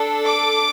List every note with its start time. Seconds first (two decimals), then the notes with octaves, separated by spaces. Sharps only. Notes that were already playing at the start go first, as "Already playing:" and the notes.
Already playing: D4 A4
0.26 D6